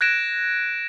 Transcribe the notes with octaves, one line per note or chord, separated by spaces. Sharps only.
F#6 G#6 A#6 D7 E7